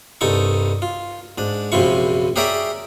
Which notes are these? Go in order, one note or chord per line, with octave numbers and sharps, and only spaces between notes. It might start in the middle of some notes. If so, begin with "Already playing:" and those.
C2 G2 D#4 A4 C#6
F4
G#2 D4
A#1 F#2 C3 E4 F4 C#6
G4 G#4 A#4 C#5 D5 E5